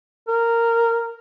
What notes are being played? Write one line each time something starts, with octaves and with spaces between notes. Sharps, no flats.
A#4